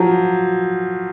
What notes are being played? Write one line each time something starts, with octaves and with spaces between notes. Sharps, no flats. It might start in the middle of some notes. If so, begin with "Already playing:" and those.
Already playing: F3 F#3